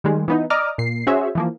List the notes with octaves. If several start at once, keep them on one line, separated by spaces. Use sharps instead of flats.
D#3 G3 G#3
E3 B3 D#4
D5 D#5 A#5 D6 D#6 F6
A#2 C7
C#4 F#4 G#4 C5 C#5 E5
E3 F3 A#3